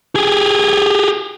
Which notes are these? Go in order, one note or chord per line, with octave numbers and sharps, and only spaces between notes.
G4 G#4